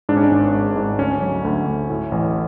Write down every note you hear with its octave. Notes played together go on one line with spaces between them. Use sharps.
G#2 D4
C#4
D4
G#1
G#2
G#2
D2 C#4
F#3
D2
D2
A2
A1